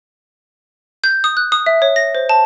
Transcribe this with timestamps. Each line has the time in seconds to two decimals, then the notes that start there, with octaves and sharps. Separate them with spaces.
1.04 G6
1.24 D#6
1.37 F#6
1.52 D#6
1.66 E5
1.82 C#5
1.96 A#6
2.15 C5
2.29 A5